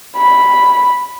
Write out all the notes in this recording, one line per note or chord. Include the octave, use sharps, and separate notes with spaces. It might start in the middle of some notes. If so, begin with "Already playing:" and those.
B5